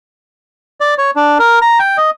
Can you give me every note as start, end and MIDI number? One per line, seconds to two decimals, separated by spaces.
0.80 0.94 74
0.98 1.11 73
1.16 1.38 62
1.39 1.59 70
1.62 1.79 82
1.79 1.97 79
1.97 2.10 75